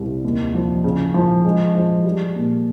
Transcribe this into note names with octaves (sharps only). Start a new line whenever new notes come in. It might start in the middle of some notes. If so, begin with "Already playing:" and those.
Already playing: C2 G3
D#2
F3
C#3
F3
G#3
F3
G3
A#2